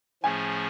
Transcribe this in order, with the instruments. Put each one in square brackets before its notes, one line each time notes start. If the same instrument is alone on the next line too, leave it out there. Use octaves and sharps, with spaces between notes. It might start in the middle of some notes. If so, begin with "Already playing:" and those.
[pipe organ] A2 F3 A3 C#4 G#4 [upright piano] G#5